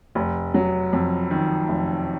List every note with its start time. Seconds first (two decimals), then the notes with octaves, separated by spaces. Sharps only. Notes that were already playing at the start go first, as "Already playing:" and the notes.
0.15 F1
0.54 F#3
0.93 F2
1.31 D#3
1.68 F1